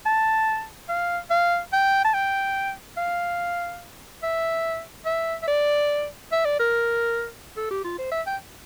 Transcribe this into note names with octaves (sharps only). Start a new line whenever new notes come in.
A5
F5
F5
G5
A5
G5
F5
E5
E5
E5
D5
E5
D5
A#4
A4
G4
F4
C5
E5
G5